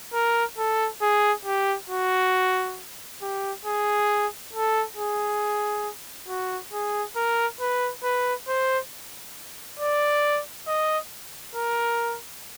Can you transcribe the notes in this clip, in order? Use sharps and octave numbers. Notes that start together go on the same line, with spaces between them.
A#4
A4
G#4
G4
F#4
G4
G#4
A4
G#4
F#4
G#4
A#4
B4
B4
C5
D5
D#5
A#4